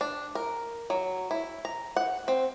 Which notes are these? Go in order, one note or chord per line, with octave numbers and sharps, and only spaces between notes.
D4
A#4
F#3
E4
A#5
F#5
C4